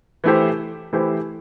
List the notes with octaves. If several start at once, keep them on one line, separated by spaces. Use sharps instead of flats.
E3 A3 E4 G4 C5
E3 A3 E4 G4 C5